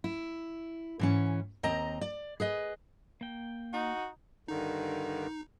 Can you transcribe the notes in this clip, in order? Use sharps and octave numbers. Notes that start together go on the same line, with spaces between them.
E4
G#2 E3 C#4
D#2 C4 D#5 A#5
D5
G#4 B4 D#5
A#3 G5
D#4 F#4
G2 D3 D#3 D#4